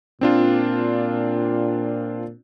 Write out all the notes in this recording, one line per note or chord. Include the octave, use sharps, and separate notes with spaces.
A#2 C4 D4 F4